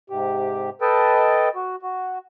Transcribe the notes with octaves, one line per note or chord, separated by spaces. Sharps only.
G#2 C3 G4
A4 B4 D#5 G5 A5
F#4
F#4